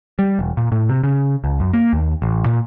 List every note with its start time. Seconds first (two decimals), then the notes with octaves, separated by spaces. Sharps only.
0.19 G3
0.39 E1
0.57 A#2
0.72 A2
0.89 C3
1.04 C#3
1.44 C#2
1.60 F#2
1.73 A#3
1.93 D#2
2.22 A1
2.46 A#2